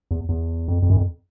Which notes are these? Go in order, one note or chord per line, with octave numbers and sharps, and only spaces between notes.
E2
E2
F2
F2
F#2
F2